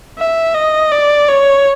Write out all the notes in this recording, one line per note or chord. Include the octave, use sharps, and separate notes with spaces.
E5
D#5
D5
C#5